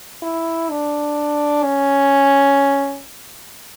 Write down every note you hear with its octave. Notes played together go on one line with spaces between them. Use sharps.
E4
D4
C#4